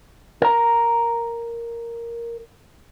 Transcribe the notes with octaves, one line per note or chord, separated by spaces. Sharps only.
A#4 A#5